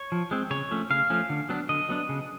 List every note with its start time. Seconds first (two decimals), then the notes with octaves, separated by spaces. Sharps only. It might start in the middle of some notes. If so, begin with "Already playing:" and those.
Already playing: C#5
0.12 F3
0.31 G#3 C4
0.51 C#3 C#5
0.71 F3 A3 C#4
0.90 C#3 F5
1.10 F3 A3 C#4
1.30 D3
1.49 F#3 B3 D4
1.69 D3 D#5
1.89 F#3 B3 D4
2.09 C#3